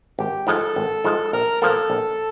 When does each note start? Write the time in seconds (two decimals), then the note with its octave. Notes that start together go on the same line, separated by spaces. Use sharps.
0.19 G#1 G4
0.47 G#2 F3 G#3 A4
0.76 G#1
1.04 G#2 F3 G#3
1.33 A#1 A#4
1.62 A#2 F3 A#3 A4
1.90 A#1